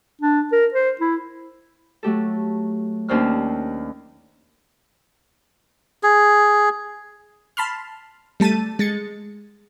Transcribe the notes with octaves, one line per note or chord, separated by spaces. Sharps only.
D4
A#4
C5
E4
F#3 A3 G4 A4
D#2 C#4 D4 C5 E6 F6
G#4
A5 B5 C6 F6
G3 A3 A5 A6 D#7
G#3 A6 C#7